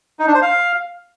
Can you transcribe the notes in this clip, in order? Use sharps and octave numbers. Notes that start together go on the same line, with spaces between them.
D#4
D4
C5
F5